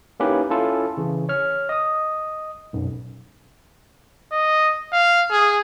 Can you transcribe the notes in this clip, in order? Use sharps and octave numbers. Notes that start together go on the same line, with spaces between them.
A#3 C#4 D#4 E4 G4 B4
C#4 E4 F4 A4 A5
C#3 E3
C#5 F6
D#5 D#6
B1 F#2
D#5
F5
G#4